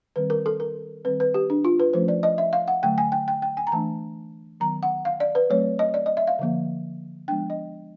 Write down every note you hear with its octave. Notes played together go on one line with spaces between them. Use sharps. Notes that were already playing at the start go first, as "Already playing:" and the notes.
D#3 G3 C4 B4
A#4
A4
A#4
D#3 G3 C4 B4
B4
G4
D4
F4
B4
F3 A3 C#4 C5
D5
D#5
E5
F5
F#5
D3 F#3 A3 G5
G#5
G5
G5
G5
G#5
A#5
E3 A3 D4 A5
D#3 F#3 B3 A#5
F#5
F5
D5
B4
F#3 A3 C4 C#5
D#5
D5
D#5
E5
F5
D3 F3 A#3
F3 G#3 B3 D4 G5
D#5